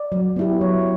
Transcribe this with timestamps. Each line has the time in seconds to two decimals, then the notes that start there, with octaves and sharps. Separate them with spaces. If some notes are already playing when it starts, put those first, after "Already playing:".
Already playing: D5
0.12 F#3
0.36 B3 E4 G4
0.61 F#3 C#5